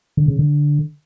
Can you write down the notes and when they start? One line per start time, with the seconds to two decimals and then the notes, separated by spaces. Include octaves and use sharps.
0.17 D3
0.28 C#3
0.39 D3